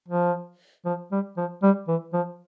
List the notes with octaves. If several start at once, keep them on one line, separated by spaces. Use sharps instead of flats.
F3
F3
G3
F3
G3
E3
F3